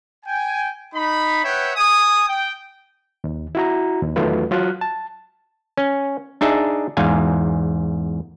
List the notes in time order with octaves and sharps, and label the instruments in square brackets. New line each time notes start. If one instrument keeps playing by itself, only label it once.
[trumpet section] G5 G#5
D#4 B5
B4 C#5 E5 F#5 G5
G#5 D#6
G5
[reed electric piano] D#2
E4 F#4 A#5
D#2
E2 D#3 F#3 A3 F4 B4
F#3 F4 F6 F#6
A5
[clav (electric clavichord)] C#4
D4 D#4 G#4 E5
E2 G#2 F5 G#5